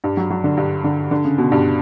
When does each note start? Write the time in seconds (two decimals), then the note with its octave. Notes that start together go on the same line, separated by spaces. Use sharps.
0.04 G2
0.17 F#3
0.30 F#3
0.44 D3
0.57 G2
0.84 D3
1.11 D3
1.25 C#3
1.38 B2
1.52 G2